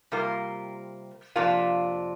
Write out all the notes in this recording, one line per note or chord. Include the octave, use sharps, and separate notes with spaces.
C3 G3 A#3 F4 A#4
F2 C3 A#3 D4 F4